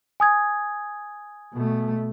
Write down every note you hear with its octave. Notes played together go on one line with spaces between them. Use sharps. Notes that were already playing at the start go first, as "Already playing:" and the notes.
G#5 D#6 G#6
B2 A3